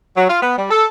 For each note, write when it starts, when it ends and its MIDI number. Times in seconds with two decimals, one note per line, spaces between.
0.17 0.29 54
0.30 0.40 65
0.43 0.57 59
0.58 0.67 55
0.71 0.87 69